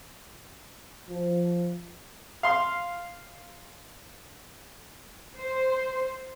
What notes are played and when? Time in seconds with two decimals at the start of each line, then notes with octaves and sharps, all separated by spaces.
1.09 F3
2.43 F5 C6
5.36 C5